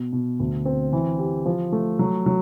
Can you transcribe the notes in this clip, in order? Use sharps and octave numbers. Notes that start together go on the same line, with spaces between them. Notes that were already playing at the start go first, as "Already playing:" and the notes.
Already playing: B2
B2
D2
C4
E3
G4
F3
A3
F#3
F#3